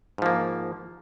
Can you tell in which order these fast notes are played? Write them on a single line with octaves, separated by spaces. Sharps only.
G#2 F3 A#3